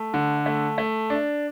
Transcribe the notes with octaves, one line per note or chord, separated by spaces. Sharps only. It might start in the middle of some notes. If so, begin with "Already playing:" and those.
Already playing: A3
D3
A3
A3
D4